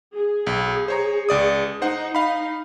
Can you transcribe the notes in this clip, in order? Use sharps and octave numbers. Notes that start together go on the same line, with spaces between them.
G#4
B1
C5 C#5 A#5
C#2 D5 D#6
D#4 C5 F#5
D#4 F5 B5